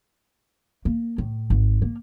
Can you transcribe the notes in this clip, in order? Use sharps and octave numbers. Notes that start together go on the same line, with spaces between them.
A#3
A2
G#1
A#3